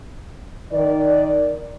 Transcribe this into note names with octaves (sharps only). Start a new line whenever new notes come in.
D#3 D5